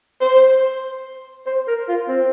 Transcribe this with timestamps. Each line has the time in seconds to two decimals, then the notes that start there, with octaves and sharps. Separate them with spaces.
0.21 C5
1.46 C5
1.67 A#4
1.88 F4
2.08 C4